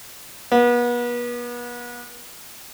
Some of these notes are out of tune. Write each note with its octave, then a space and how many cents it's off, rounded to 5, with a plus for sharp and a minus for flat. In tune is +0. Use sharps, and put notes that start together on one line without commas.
B3 -35